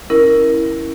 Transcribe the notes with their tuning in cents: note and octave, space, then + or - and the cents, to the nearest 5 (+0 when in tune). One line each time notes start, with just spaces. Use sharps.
C#4 +0 E4 -10 A#4 +0